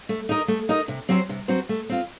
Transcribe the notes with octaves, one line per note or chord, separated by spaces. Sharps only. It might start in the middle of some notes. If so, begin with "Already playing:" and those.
A3
D#4 A#4 D#5
A3
D#4 A#4 D#5
C3
F#3 C4 F#4 C5
C3
F#3 C4 F#4 C5
A3
C4 F4